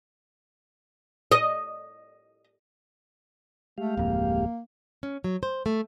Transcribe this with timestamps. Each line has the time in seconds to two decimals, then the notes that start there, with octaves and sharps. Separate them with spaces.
1.32 D#5
3.78 G#3 A3 G4 F5
3.97 D1 F2 A#3
5.03 C#4
5.24 F#3
5.43 C5
5.66 A3